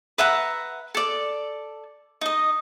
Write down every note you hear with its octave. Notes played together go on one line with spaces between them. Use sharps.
B4 E5 F#5 A#5
A4 D5
D#4 D#5